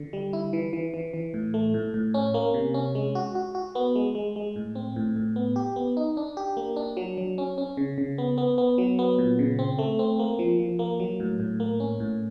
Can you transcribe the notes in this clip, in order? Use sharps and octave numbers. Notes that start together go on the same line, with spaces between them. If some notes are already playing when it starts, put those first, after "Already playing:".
Already playing: D3
G3
E4
E3
E3
E3
E3
A2
A3
A2
A2
C#4
A#3
C3
C#4
G#3
F#4
F#4
F#4
B3
G#3
G#3
G#3
A2
C4
A2
A2
B3
G4
B3
D#4
D4
G4
A#3
D4
F#3
F#3
C#4
C#4
C#3
C#3
B3
B3
B3
F#3
B3
A#2
C#3
C4
A3
C4
A#3
F3
F3
A#3
F#3
A2
A2
A#3
C#4
A2